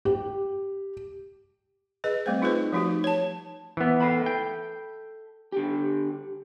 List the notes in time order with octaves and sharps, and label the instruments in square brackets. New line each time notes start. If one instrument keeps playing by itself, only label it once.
[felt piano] G4
[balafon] G#4 B4 D#5
G3 A3 C4 C5
D#4 F4 G#4 B4 C5
F3 A3 D#4 F#4 G4
C#5 A5
[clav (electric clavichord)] E3 B3
[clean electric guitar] A4 E5 B5
[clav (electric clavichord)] G5
[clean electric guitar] D3 G4